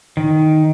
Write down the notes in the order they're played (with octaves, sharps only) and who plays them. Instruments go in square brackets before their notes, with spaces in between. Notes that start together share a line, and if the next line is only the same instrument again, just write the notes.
[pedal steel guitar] D#3